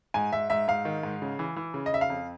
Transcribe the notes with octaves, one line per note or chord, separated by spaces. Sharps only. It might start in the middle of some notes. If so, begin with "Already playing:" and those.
G#2 G#5
G#2 E5
G#2 E5
G#2 F5
D#3
G#2
C#3
E3
E3
C#3
D#5
C#3 E5
F5
F2